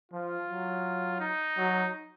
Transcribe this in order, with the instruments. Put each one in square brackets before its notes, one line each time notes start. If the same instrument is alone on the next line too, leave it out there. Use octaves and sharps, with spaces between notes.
[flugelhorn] F3 [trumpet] F4
[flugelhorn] F#3
[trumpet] D#4
[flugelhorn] F#3